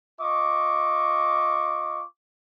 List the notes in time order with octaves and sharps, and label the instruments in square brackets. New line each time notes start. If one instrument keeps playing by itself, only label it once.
[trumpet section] F4 D#5 C#6 D6